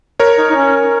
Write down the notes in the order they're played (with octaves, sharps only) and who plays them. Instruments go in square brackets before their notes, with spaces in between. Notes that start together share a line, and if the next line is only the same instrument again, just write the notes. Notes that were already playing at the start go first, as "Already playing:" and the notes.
[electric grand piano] A#4 C#5
[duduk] D#4
D#4
C#4